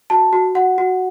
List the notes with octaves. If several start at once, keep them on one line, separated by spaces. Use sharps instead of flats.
F#4 A5
F#4
F#4 F#5
F#4